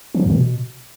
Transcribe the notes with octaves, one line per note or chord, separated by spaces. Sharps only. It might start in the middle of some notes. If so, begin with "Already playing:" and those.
E3
F3
F2
D3
B2